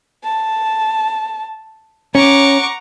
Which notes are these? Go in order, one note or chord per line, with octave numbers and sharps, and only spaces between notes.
A5
C#4 F#5 A#5 C#6 D6